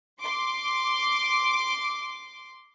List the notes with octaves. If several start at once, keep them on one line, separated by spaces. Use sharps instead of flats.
C6 D6